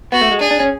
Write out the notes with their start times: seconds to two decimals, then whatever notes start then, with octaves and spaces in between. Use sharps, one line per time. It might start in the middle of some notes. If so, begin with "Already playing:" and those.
0.12 B3 F#4
0.21 A3
0.31 G#3
0.41 D4 G#4
0.51 D4
0.60 C#4